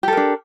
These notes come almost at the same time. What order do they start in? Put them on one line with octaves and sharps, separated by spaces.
G4 A4 A#4 D4